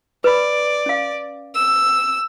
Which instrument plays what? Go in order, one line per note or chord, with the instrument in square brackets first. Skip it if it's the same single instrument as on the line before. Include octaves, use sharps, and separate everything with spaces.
[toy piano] B4 B5 [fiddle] D5
[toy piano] C#4 F5
[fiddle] E6